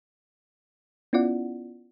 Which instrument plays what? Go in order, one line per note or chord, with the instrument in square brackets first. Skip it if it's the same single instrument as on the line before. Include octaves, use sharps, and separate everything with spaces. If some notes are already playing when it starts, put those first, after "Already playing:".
[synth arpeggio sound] B3 C#4 E4 F4 D5 F#5